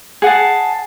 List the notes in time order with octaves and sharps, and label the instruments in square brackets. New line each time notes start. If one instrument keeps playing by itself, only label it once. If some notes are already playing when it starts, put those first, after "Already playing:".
[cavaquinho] G#4 F#5 G#5 A5